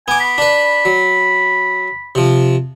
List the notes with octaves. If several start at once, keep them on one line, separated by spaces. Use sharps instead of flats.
B3 G#5 D6
B5
D4 B4
F#3
C3 F3